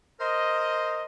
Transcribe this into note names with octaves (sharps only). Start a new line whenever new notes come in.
A#4 C5 D#5